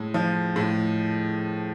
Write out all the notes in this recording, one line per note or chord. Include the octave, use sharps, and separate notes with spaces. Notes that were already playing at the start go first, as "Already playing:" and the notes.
Already playing: A2 G#3
F3
A2